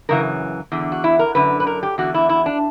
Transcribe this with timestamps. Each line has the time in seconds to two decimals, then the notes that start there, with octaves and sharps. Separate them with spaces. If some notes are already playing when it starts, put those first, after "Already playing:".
0.09 F#2 C#3 E3 A#4
0.72 E2 D3
0.92 F#4
1.04 E4
1.19 A#4
1.35 F#2 D3 B4
1.60 B4
1.67 A#4
1.83 G4
1.98 E2 D3 F#4
2.14 E4
2.29 E4
2.46 D4